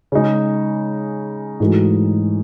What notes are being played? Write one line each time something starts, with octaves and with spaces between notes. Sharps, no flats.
C#3 G#3 D#4
G#2 E3 A3 D#4 F#4